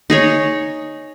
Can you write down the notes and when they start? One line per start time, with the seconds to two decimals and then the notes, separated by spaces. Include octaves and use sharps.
0.10 D#4 G#4 C#5